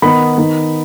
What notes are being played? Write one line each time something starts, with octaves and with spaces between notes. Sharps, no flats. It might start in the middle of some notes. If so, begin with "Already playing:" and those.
D#3 B3 D#4 B5
D#3 B3 D#4